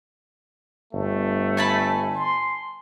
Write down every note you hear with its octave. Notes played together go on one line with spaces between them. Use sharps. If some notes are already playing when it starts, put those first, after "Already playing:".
G1 A3
G#5 A5 B5
C6